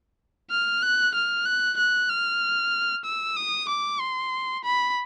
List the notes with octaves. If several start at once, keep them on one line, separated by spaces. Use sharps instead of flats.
F6
F#6
F6
F#6
F#6
F6
E6
D#6
D6
C6
B5